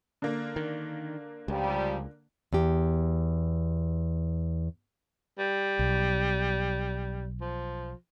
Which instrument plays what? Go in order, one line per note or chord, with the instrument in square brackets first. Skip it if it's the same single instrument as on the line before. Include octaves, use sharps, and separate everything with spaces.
[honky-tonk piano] D3 A#3
[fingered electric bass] D#3
[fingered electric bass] C#2 [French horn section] A#2 F3 G3
[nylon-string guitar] E2 G4
[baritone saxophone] G3
[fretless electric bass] B1
[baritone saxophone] F3